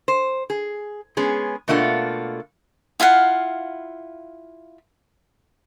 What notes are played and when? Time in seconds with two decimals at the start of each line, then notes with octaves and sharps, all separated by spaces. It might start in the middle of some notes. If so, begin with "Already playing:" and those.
0.08 C5
0.50 G#4
1.17 G#3 B3 C#4 G#4
1.68 B2 A3 A#3 D4 F4 F#5
3.00 E4 F4 F5 F#5